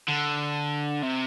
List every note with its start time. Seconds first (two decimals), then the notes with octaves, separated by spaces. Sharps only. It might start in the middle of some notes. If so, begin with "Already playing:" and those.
0.09 D3
1.03 C3